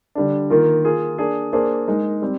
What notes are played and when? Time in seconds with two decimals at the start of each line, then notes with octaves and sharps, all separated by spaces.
0.15 D3 G3 D4
0.50 D#3 A#3 F4 A#4
0.84 A#3 F4 G#4
1.18 A#3 D4 G#4
1.53 A#3 D4 G#4 C5
1.87 G#3 D#4 A#4
2.22 G3 C4